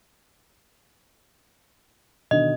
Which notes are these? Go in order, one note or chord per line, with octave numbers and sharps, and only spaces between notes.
B2 D3 D#3 D#5